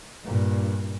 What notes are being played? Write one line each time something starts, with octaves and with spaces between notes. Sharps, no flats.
G2 A#2